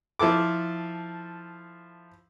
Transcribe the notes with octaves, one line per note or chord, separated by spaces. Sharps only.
F3 E4 A4 D6